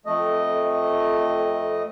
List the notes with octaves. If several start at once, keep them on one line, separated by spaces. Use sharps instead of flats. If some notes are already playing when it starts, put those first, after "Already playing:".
F2 A3 D#5